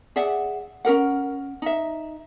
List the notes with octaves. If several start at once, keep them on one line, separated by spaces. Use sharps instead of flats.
G#4 D5 E5 F#5
C#4 G#4 A#4 F#5
D#4 E5